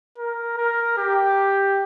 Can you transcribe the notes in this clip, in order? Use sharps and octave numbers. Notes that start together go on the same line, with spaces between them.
A#4
A#4
G4